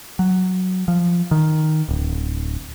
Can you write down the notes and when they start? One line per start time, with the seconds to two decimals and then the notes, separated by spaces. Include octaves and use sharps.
0.19 F#3
0.88 F3
1.31 D#3
1.89 D1